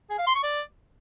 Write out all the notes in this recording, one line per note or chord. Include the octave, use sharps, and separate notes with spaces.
G#4
F5
C6
C#6
D5